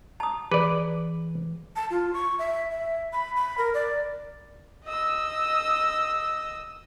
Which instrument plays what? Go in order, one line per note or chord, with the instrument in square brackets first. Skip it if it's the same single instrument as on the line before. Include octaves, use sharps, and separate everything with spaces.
[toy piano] A5 D#6 [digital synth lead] A#5
[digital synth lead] E3 [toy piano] G#4 [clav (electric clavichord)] B4 D5
[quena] A5
F4
C#6
E5
E5
B5
B5
A#4
D5
[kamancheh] D#5 E6